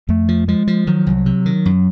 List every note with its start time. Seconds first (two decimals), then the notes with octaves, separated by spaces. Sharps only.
0.09 F2 A3
0.28 F3
0.48 F3 G#3
0.67 F3
0.87 D#3 F#3
1.07 C2
1.26 C3
1.46 D#3
1.66 F#2